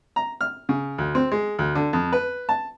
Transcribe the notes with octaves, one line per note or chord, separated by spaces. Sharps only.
A#5
F6
C#3
D2
C4
G#3
D2
D3
F2
B4
A5